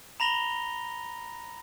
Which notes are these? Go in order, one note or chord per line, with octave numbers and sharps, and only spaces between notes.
A#5 B5 A#6 F7 G7